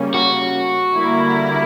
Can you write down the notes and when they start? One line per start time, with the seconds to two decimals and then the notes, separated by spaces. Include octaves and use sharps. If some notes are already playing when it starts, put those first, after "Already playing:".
Already playing: C#3 G3 A#3 C#4
0.14 F#4
0.94 D3 G3 A#3 E4 A#4